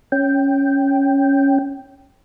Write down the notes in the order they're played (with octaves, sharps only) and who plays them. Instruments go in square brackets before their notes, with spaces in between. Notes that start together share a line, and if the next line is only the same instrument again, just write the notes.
[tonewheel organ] C#4 G5